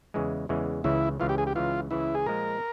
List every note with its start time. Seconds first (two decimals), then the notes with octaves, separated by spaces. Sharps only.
0.14 E2 C#3 E3 G#3
0.49 E2 C#3 E3 G#3
0.84 C#2 C#3 E3 E4
1.20 C#2 C#3 E3 F4
1.29 G4
1.38 G#4
1.47 G4
1.55 C#2 C#3 E3 F4
1.91 C#2 C#3 E3 E4
2.15 G#4
2.26 A#2 F3 G#3 A#4